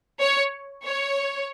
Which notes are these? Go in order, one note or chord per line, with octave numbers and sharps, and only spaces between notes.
C#5
C#5